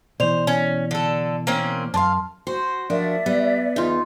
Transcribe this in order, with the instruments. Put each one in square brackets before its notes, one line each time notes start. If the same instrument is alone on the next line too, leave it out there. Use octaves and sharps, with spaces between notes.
[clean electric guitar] B2 E3 [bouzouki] C5 [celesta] D5 F7
[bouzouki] C#4
D3 A4
A#3 C4 C#4
[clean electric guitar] F#2 [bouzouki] D4 F5 [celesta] A5 C6
[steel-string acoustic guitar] F#4 [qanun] C5
[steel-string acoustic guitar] F3 A#3 F#4 [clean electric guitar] D4 [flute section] D5 E5
[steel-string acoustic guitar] G3 [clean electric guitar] B3
[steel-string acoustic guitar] E2 [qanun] D#4 F4